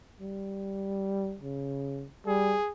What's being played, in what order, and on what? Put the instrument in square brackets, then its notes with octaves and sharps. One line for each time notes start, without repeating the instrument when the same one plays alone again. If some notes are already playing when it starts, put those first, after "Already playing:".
[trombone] G3
C#3
[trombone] G3 [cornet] G#4